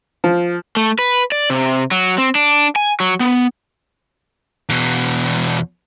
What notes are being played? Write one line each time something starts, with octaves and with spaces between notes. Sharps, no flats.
F3
A3
B4
D5
C3
F#3
C4
D4
G#5
F#3
B3
E2 B2